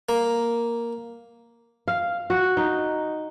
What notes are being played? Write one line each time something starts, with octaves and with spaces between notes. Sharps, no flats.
A#3
F5
F#4
D#4